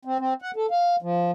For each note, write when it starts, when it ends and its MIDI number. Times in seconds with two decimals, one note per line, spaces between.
0.05 0.18 60
0.19 0.34 60
0.42 0.51 78
0.56 0.66 69
0.71 0.96 77
1.02 1.31 53